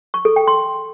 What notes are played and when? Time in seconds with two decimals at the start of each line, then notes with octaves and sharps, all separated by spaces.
0.14 C#6
0.25 A4
0.36 G5
0.48 C6